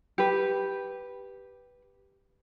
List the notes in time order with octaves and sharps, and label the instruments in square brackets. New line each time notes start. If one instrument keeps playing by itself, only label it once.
[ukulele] G4 B4